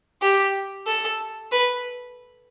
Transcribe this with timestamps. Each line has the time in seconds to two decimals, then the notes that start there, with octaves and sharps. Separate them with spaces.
0.22 G4
0.87 A4
1.51 B4